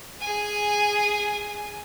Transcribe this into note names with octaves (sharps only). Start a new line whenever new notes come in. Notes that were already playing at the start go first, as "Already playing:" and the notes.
G#4 G#5